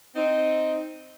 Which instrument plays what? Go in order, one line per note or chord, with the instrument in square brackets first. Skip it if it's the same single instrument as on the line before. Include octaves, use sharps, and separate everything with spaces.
[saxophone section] C4 D#4